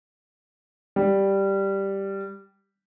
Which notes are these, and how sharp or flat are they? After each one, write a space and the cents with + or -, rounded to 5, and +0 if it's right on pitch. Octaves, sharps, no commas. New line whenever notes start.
G3 +0